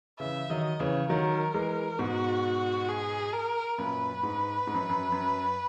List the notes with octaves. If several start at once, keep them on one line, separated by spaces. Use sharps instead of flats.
C#3 E3 E5
D#3 F#3 D#5
C#3 E3 C#5
D#3 F#3 A#4
E3 G#3
G#2 B2 F#4
G#4
A#4
F#2 A#2 B4
G#2
G#2
F#2
F#2
F#2